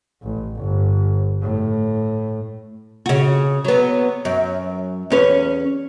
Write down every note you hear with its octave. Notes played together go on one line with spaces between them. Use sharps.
A1
G1
A2
C#3 F#4
F#3 B3
F#2
E2 C#4 B4